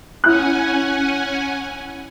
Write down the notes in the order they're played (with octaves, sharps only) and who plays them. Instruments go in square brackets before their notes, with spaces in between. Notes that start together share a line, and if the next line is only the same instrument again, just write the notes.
[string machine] C#4 F#5 G#5 [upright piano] E4 F#6